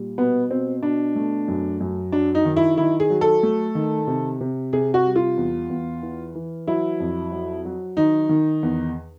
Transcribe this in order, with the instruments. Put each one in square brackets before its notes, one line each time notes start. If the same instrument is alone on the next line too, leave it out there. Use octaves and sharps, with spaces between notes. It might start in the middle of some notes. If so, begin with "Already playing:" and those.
Already playing: [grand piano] A#2 G3
B2 B3
B2 C4
B2 D4
A3
F#2
F#2
F#3 D4
D#4
D#3
E4
D#3 E4
G#4
F#3
A4
A3
D#3
C3
C3
C3 G#4
F#4
G3
F4
E2
E2
E3
E3
F#3 E4
F2
F#3
F#3
D#3 D#4
D#3
E2